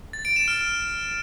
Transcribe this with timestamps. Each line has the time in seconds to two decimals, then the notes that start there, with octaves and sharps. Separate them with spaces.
0.13 A6
0.25 D7
0.36 E7
0.48 F6